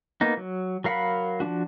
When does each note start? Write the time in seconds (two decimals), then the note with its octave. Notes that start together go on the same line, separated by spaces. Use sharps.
0.21 A#3 B3 D#4
0.37 F#3
0.84 F#3 A#4 F5 F#5 B5
1.40 F3 A#3 D4 F#4